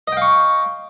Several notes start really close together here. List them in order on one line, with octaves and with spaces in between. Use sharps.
D#5 G5 F5 C#6